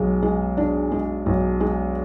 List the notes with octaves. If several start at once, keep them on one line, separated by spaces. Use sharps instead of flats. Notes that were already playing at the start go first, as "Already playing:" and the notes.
Already playing: B1 G#3
G#3
D4
G#3
B1
G#3